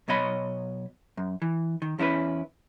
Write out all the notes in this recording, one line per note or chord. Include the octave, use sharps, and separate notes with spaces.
B1 B2 C#5 D#5 B5
F#2
E3
D#3
E2 C#4 E4 G#4 B4